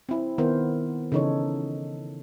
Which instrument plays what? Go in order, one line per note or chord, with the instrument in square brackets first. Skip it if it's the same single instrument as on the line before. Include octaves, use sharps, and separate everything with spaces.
[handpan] C4 E4
D#3 B3 E4 A#4 C5
C#3 E3 D#4 A4 C#5